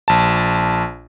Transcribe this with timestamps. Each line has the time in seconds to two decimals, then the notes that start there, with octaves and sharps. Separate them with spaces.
0.08 A#1 A5